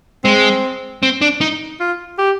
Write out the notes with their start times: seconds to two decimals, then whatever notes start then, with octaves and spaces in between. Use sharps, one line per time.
0.24 G#3 C4
1.03 C4
1.21 D4
1.41 D#4
1.80 F4
2.18 G4